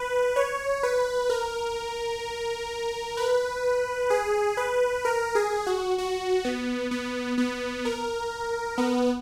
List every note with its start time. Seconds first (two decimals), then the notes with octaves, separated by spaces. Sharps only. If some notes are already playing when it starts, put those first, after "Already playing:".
Already playing: B4
0.36 C#5
0.83 B4
1.30 A#4
3.17 B4
4.10 G#4
4.57 B4
5.05 A#4
5.35 G#4
5.67 F#4
5.98 F#4
6.45 B3
6.91 B3
7.38 B3
7.85 A#4
8.78 B3